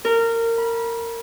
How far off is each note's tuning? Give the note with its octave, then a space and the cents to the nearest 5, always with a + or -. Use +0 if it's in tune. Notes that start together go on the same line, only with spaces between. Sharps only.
A#4 -20
B5 -35